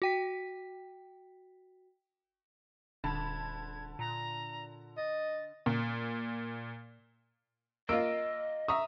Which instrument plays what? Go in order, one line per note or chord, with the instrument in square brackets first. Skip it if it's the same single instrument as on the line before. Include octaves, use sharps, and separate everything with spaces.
[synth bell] F#4 G5 B6
[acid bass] D#1 [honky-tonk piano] D3 A5 B5 [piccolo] G#6
[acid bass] A#2 [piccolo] A#5
[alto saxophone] D#5 [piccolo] A6
[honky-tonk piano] A#2
[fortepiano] A#3 F4 [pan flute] D#5 [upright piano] E6 D7
[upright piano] E5 A#5 D#6 [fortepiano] C#6